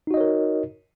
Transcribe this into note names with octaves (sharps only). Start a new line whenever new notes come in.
D#4 F#4 A#4 C#5 D#5